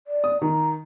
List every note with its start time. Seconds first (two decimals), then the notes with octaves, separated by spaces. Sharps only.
0.07 D5
0.24 D#6
0.42 D#3 A#5